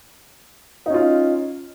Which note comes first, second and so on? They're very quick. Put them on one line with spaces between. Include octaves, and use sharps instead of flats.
D#4 C#4 F4